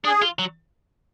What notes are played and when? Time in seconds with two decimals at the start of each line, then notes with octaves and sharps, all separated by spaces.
0.05 D4 G#4
0.22 F4
0.39 F#3